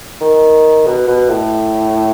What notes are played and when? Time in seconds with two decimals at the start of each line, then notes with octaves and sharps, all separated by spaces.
0.21 D#3
0.86 B2
1.08 B2
1.29 A2